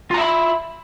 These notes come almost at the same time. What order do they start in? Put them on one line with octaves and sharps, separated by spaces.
F4 A#5 E5 B5